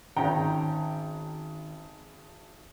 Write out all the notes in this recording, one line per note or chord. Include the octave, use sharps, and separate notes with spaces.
G#1 D#3 C#4 G5 A#5